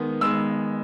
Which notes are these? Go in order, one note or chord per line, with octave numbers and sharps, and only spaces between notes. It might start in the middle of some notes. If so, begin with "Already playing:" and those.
Already playing: D#3 G#3 B3
D#3 G#3 B3 E6